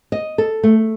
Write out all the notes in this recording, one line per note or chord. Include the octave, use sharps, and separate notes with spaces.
D#5
A4
A3